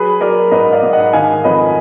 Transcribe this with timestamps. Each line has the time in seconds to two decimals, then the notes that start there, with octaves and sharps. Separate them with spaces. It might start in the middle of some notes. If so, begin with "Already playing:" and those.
Already playing: F#3 G#4 B4
0.21 F#3 A#4 D5
0.51 G#2 B4 D#5
0.72 D5 F5
0.83 G#2
0.93 D#5 F#5
1.13 D#3 F5 G#5
1.44 F2 B4 D#5